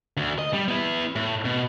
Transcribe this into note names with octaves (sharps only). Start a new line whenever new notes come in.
D2
D#5
G3
B3 E4
A2
B2